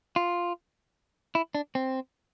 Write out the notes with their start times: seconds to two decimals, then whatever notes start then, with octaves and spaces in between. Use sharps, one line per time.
0.16 F4
1.35 E4
1.55 D4
1.75 C4